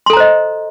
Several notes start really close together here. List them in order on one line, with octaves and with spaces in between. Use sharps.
C6 A4 A#5 C5 D#5